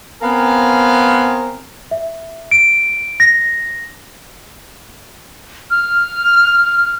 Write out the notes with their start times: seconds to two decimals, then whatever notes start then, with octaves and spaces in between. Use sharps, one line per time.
0.22 B3 C4 A#4 F5 G#5
1.91 E5
2.51 D7
3.20 A#6
5.71 F6